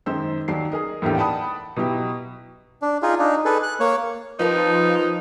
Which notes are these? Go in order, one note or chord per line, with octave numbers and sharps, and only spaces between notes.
F#2 D#3 G#3 C5 E6
D#2 F#3 D5 C7
G#4 A#4 D#5
B1 E2 A2 A#3 D4 G4
D5 F#5 G5 A5 B5 D#6
B2 F#3 E4 G4
D4
D#4 F4 G#4
D4 D#4
G#4 A4 B4
F#6
A#3 C#5
F3 D#4 G4 A#4 B4